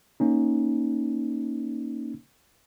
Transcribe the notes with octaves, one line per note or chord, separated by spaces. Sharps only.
A#3 C#4 D#4